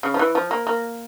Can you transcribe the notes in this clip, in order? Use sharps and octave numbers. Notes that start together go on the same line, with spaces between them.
C#3
F3
E3
F3
A#3
A#3